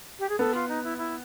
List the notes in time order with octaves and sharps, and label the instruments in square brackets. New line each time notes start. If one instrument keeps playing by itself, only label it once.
[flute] G4
G#4
[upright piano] B3 [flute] A4
[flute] F4
D#4
E4
E4